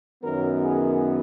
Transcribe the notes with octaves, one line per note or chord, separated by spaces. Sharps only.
F#2 D#3 F#3 B3 A#4
G#4